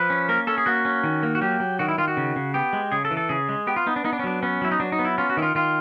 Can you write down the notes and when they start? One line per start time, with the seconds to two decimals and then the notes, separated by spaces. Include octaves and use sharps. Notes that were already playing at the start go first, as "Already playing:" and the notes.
Already playing: F3 B4
0.10 C#4
0.29 A#3 A#4
0.47 C#4 A4
0.58 G#4
0.66 A#3 F#4
0.85 C#4
1.04 D#3
1.23 A#3
1.35 F#4
1.41 F#3 G4
1.60 F#3
1.79 D#3 F#4
1.88 E4
1.98 D#3 F4
2.08 F#4
2.17 C#3
2.36 C#3
2.54 B3 G4
2.73 G#3
2.92 C#3 G#4
3.05 A4
3.11 E3
3.17 A4
3.29 C#3 G#4
3.49 G#3
3.67 B3 G4
3.76 F4
3.87 B3 D#4
3.96 D4
4.04 B3 D#4
4.13 D4
4.19 C#4
4.24 F#3 D4
4.43 B3 C#4
4.62 F#3 E4
4.72 D#4
4.80 F#3 D4
4.92 D#4
4.99 B3
5.05 E4
5.18 C#4 F4
5.30 F#4
5.37 D#3 E4
5.42 F4
5.55 D#3 F4